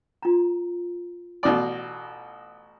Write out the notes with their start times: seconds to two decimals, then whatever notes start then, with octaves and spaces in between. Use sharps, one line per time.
0.23 F4 A#5
1.43 A1 B2 D5